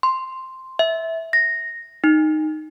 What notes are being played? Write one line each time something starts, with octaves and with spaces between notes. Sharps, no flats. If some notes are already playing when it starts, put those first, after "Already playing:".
C6
E5
A#6
D#4